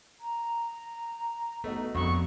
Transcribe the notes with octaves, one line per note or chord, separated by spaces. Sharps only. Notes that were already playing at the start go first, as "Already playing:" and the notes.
A#5
A3 B3 D#4 F#4
A#1 F2 B2 B5 C#6